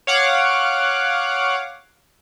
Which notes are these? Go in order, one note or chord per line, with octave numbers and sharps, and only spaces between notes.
C#5 F5 F#5 D6